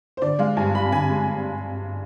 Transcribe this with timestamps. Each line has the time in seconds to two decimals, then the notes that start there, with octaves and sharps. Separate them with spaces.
0.17 C5
0.22 D3 D5
0.39 G#3 F5
0.57 G2 G#5
0.74 G2 B5
0.92 D3 G#5
1.10 G#3